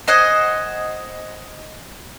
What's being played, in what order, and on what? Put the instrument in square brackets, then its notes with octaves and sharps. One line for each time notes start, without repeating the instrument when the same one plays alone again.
[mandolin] C5 D#5 F#5 G#5